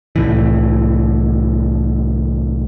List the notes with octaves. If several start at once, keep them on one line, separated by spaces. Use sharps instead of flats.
C2 A2 E3